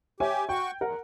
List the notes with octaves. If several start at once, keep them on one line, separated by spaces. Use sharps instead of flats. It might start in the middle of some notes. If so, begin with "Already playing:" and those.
G4 C#5 E5 G#5
F#4 G5 C#6
E2 A#4 F#5